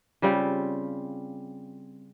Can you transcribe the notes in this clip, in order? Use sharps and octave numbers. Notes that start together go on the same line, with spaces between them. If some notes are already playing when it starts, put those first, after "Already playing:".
C#3 G3 C4 F4